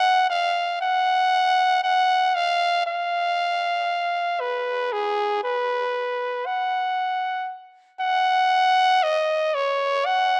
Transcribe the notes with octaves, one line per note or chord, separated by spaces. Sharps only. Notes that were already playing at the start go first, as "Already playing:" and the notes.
Already playing: F#5
F5
F#5
F#5
F5
F5
B4
G#4
B4
F#5
F#5
D#5
C#5
F#5